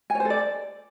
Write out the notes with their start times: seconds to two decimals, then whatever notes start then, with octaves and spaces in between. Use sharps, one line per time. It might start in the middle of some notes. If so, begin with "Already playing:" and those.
0.10 G#5
0.15 C#5
0.20 C5
0.25 A4
0.30 D5